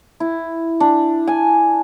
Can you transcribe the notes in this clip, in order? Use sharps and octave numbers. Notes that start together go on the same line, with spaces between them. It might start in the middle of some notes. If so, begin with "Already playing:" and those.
E4
D4
G#5